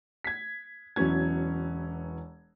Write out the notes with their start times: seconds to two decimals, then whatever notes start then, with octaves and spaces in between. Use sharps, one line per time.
0.24 G#6 B6
0.96 E1 E3 F#3 B3 C#4 G#6